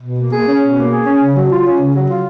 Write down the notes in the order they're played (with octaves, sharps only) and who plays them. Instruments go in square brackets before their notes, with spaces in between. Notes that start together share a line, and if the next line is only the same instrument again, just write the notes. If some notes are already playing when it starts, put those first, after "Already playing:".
[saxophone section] B2
A#3
G#4
C#4
B2
A#3
G#4
C#4
C#3
F#3
F4
C#4
C#3
F#3
F4